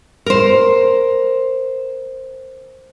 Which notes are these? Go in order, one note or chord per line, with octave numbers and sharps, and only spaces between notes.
A#4 C5